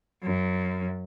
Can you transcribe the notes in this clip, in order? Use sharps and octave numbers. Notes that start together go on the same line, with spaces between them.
F#2